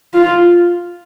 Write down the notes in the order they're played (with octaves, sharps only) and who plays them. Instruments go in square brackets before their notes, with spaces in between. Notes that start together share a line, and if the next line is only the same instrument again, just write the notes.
[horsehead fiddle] F4